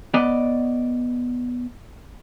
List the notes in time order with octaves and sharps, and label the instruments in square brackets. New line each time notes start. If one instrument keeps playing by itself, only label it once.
[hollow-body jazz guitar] B3 D5 D#5